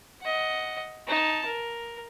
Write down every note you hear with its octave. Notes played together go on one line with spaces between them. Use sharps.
D#5 F#5
D#4 A5
A#4